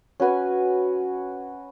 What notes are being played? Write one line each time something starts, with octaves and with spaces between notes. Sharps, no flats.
C#4 F#4 B4 G#5